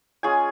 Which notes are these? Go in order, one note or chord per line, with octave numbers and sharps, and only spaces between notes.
G#3 C#4 F4 G#4 G#5